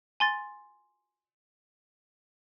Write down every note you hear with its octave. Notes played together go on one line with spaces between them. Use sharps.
G#5 C6 A6